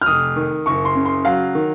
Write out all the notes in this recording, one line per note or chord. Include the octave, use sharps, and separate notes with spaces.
F6
F1 D#6
D#3
F#1 C#6
C6
C#3
C6
F#3 F5
D#3